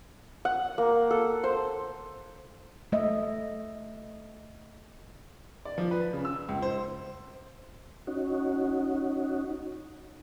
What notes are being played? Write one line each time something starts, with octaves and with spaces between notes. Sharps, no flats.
F#5
A#3
A4
C5
A3 D#5 E5
D5
F3
B4
C#3
E6
C#2
C5
C#4 D#4 F#4